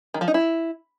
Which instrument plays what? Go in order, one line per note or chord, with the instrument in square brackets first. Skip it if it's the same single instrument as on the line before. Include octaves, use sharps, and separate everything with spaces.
[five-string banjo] D#3
F3
D#4
E4